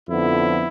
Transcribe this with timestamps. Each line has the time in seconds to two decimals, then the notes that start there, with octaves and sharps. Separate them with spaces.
0.08 F2 D3 F3 B3 E4